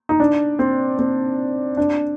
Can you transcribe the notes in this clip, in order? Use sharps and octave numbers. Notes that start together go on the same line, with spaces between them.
D#4
D4
C4
C4
D4